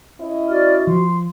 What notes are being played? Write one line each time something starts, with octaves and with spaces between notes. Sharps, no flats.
C#4 E4 D#5
F#4 D5 F6
F3 C6